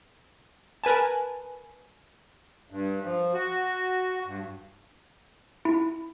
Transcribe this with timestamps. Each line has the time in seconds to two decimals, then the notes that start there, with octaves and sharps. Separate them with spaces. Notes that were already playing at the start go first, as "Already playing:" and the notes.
0.84 A#4 B4 G#5 A5
2.70 G2
3.04 F3
3.34 F#4
4.26 G2
5.65 E4